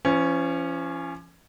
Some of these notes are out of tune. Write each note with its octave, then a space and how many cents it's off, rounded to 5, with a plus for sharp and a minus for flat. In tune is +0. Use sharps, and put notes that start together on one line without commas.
F3 -40 C#4 +0